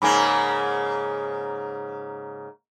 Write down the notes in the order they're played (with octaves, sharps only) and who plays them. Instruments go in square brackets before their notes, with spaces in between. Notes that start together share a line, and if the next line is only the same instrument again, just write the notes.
[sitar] G#2 C#3 A#3 [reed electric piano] G#5 B5